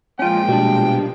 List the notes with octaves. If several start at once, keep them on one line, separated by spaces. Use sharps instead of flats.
A#2 F3 G#3 C#4 F4 G5
B2 G3 D4